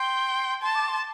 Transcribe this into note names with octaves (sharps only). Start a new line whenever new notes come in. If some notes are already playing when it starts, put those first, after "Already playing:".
Already playing: G5 C6
A5 C6
D6
C6